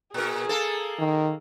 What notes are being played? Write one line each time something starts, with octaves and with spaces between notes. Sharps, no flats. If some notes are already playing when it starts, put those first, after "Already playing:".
A#2 G#4 A#4
A#3 A4
D#3